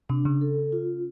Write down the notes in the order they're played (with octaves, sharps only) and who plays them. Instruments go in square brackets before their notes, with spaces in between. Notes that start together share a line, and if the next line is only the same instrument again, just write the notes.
[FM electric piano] C3 [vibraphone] D4
[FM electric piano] C#3
[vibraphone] A4
F4